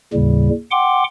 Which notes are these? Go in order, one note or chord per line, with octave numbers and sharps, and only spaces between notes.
D#2 A2 C#3 G3
F#5 G5 C6 D6